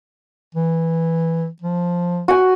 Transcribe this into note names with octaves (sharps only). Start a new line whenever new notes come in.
E3
F3
F#4 G#5